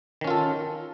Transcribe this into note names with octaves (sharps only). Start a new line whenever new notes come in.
D#3 C#4 F4 A4